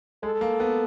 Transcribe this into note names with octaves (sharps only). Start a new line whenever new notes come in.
G#3 A4
A#3
B3